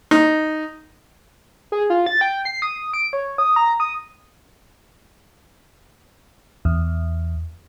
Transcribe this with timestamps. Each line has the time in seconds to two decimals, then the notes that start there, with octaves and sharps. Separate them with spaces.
0.11 D#4
1.72 G#4
1.90 F4
2.06 A6
2.21 G5
2.45 C7
2.62 D#6
2.93 D7
3.13 C#5
3.38 D#6
3.56 A#5
3.80 D#6
6.65 E2